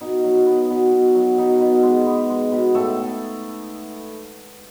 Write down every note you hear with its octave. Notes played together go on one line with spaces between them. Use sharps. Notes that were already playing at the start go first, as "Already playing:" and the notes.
B2 D#4
F#3
B3
B2
B2
F#3
B2 D#4
B2
G#3
B3
G#3
B2
A2 A3 A4